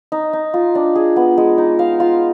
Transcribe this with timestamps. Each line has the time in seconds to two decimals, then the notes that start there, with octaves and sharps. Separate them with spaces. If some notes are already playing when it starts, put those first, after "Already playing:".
0.12 D#4
0.33 D#4
0.54 F4
0.75 D4
0.95 G#4
1.16 B3
1.38 G#3
1.58 D#4
1.79 F5
2.00 F4